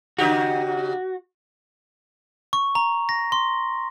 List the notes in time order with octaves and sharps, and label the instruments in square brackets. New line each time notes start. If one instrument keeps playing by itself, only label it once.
[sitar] C#3 D#4 G4 [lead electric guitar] F#4
[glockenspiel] C#6
A#5
A#6
C6